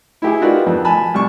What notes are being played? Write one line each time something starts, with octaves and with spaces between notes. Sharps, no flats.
E4 G4 G#4
D#4 F4 F#4 A#4 B4 D5
F2
G#5 A5 B5
C2 G3 C#6